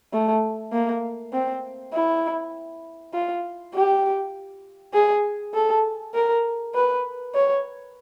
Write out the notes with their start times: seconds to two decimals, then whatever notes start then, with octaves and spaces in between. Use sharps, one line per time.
0.13 A3
0.72 A#3
1.33 C4
1.93 E4
3.13 F4
3.74 G4
4.93 G#4
5.54 A4
6.14 A#4
6.74 B4
7.34 C#5